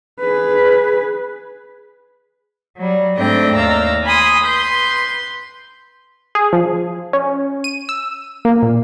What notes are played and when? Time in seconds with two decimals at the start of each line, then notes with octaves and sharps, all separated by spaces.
0.20 G#4 B4
2.78 F#3 G3
3.17 G#2 A3 C4 D4 D#5 G5
3.55 D#2 D5 F5 A#5 E6
4.04 G#5 B5 C6 D#6
4.44 B4 C6 G6
6.35 G#4
6.53 F3
7.13 C#4
7.64 D#7
7.89 E6
8.45 A#3
8.63 A#2